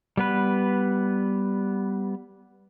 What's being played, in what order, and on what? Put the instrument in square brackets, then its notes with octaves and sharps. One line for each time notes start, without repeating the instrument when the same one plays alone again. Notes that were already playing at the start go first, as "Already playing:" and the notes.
[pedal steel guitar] G3 B3 B4